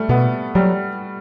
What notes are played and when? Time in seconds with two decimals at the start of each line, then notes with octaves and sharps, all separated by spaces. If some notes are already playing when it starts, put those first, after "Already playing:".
Already playing: G3 A3
0.09 B2 B3
0.55 F#3 G3